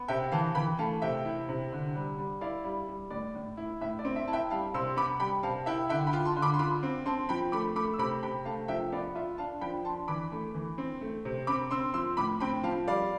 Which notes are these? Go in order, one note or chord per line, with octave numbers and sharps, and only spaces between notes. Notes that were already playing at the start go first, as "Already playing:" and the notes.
Already playing: B3
C3 E5 G5
E3 F5 A5
E3 G5 B5
A3 F5 A5
C3 E5 G5
E4
C3
D3
G3
G3
E4 D5 F5
G3
G3
A2 D5
A2
E4
A2 E5
D5
C4
E5
E4 A5
E5 G5
G3 F5 A5
C3 C6 E6
B3 B5 D6
G3 G5 B5
C3 F5 A5
E4 E5 G5
D3 E5 G5
G5 B5
F4
A5 C6
D3
B5 D6
C6
F4 B5 D6
C4
C4 A5 C6
F3 G5 B5
A3 B5 D6
A3 B5 D6
E6
C3 B5 D6
C3 G5 B5
A3 F5 A5
F3 E5 G5
B3 D5 F5
F4 E5
D4 F5 A5
F3 G5 B5
D4 A5 C6
E3 B5 D6
A3
E3
C4
A3
C3
C4 B5 D6
C4 C6 E6
F3 C6 E6
A2 B5 D6
C4 G5 B5
F3 F5 A5
G3 D5 F5